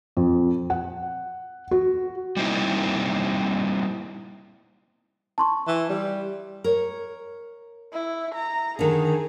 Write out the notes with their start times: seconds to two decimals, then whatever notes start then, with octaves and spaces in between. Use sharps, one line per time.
0.17 F2
0.70 F#5
1.71 F#4
2.37 G3 A#3 C4 D#4 E4
5.38 A5 C6 C#6
5.67 E3
5.90 G3 D5
6.64 A#4 C#5
7.93 E4
8.35 A#5
8.79 D3 D#3 G#4